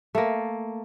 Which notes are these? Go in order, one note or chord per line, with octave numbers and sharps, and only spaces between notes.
A3 A#3